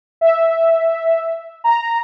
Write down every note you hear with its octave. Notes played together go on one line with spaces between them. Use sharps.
E5
A#5